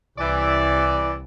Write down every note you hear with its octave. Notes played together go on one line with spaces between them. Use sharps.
C2 E3 D5